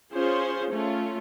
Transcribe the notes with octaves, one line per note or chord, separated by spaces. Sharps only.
C#4 F4 G#4 C5
A3 C#4 F4